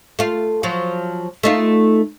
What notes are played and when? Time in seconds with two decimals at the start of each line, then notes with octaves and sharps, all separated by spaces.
0.19 A3 F4
0.63 F3 F#3
1.43 A3 D#4 F4